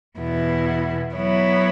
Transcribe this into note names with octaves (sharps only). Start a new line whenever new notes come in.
E2 B2 B3 E4
F#3 B3 E4 C#5